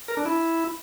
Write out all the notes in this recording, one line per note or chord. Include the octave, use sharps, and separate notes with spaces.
A#4
D4
E4